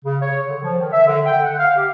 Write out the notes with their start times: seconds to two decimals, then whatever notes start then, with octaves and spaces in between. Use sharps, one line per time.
0.05 C#3
0.22 C#5
0.49 D3
0.62 F3
0.79 D#3
0.92 E5
1.07 D3
1.25 G5
1.43 F#5
1.58 F5
1.76 G4